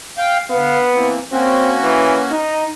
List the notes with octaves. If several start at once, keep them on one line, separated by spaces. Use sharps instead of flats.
F5 G5
D2 B3 F5
E3 A#3 C4
A#3 C4 C#4 F#4
E3
D#4